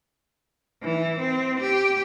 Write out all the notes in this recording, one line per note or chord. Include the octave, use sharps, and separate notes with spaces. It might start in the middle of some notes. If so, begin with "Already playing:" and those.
E3
C4
G4